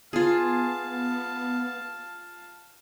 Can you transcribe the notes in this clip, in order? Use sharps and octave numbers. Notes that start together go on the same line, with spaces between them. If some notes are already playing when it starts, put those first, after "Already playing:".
B3 F4 G#4 F5 A5